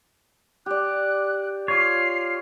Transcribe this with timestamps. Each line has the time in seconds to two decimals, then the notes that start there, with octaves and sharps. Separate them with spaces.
0.66 G4 D5 F#6
1.68 F4 C#5 C7